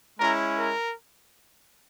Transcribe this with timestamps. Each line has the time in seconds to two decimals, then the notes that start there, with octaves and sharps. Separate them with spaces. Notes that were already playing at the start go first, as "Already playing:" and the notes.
0.19 G#3 C#4 E4 A#4
0.58 A#4